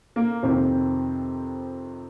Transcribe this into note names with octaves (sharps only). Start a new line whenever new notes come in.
A#3
F2 C3 D#3 C4